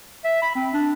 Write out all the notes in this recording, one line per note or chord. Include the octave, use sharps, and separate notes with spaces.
E5
B5
C4
D4